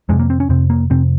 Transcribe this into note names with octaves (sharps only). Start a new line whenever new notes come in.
F2 C3 G#3
A#3
C4
C#4
F2 C3 C4
A#3
F2 C3 C4